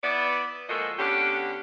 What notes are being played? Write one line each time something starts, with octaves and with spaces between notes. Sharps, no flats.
B3 E4 B4 D5
F3 G#3 A#3 F#4 A4 D#5
D3 B3 C#4 G4